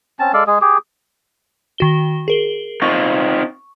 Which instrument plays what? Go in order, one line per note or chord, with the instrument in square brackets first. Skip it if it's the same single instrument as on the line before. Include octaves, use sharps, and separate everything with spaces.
[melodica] C4 C#4 A5
G#3 A4 D5 F5
G#3 G#4
G4 G#4
[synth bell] D#3 F#4 G7
G#4 A#4 G7
[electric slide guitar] C4 D#4 F4 [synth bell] C#6